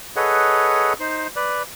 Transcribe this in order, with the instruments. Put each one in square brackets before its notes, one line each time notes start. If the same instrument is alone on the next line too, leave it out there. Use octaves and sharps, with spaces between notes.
[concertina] G#4 A4 B4 C#5 D#5 F#5
D#4 C5
B4 D5